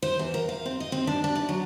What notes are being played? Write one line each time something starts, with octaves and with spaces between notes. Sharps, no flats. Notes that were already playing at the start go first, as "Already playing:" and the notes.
C5
E2
A#4
F5
C4
D#5
C4
D4
D4
D4
F#3